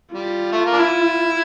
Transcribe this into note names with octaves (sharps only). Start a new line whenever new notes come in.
G3 F4
A3
A#3
D4
E4